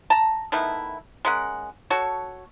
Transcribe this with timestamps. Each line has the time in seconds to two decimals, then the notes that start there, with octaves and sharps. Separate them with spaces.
0.10 A5 A#5
0.52 D#3 A3 B3 E4
1.25 G#3 C#4 A#4 F#5
1.90 F#4 A4 C#5